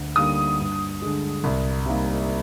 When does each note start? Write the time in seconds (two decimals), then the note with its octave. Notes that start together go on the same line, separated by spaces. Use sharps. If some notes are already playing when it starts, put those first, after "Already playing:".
Already playing: D2
0.16 D3 G3 A#3 D#4 D#6
0.59 G2
1.02 D3 G#3
1.44 C2
1.86 C3 G3 A#3 D#4